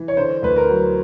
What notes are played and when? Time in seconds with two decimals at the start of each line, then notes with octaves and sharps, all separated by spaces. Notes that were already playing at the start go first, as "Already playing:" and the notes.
Already playing: E3
0.08 C#5
0.17 D3 C5
0.43 D2 B4
0.56 A#4
0.69 F#3